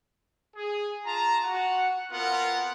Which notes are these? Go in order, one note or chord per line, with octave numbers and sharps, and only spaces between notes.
G#4
F4 A5 A#5
F#4 F#5
B3 C4 F4 A#4 F#5